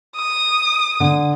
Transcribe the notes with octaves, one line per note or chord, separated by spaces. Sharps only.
D#6
D3